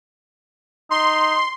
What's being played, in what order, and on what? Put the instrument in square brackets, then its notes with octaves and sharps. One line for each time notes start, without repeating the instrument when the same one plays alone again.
[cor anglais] D#4 [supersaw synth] C6